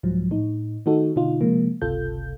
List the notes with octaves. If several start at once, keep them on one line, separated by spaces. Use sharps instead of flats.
C2 G#2 F3 F#3
A2 D#4
D#3 A3 D#4 F#4 A4
B2 D3 D#4 F4
C3 F3 G#3 A#3
G1 C#2 C3 F4 A4 G6